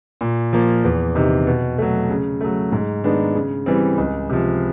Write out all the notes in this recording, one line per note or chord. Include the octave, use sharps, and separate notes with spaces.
A#2
F3 A#3
E2
C3 D#3
B2
F#3 A3
C#3
F#3 A3
G#2
D#3 G#3 B3 D4
C#3
E3 G3 C4
C#2
C3 F3